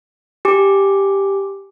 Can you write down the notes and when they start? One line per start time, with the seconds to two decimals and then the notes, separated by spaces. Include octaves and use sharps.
0.45 G4 G#5 D6